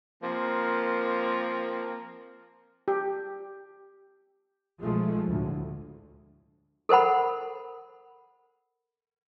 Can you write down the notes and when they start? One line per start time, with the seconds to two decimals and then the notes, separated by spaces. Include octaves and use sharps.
0.23 F3 A#3 C4 A#4
2.88 G4
4.81 B1 F3 G#3 A3
5.27 D2 A2
6.89 A4 A#4 C5 F#5 B5